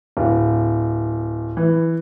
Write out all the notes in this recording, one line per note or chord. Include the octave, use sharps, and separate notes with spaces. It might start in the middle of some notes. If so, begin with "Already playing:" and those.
D1
E3